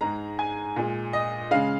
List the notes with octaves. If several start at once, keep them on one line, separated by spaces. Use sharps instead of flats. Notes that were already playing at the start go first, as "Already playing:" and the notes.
G#2 G#3 A#5
G#5
A#2 G#3
D#5
C#3 G#3 F5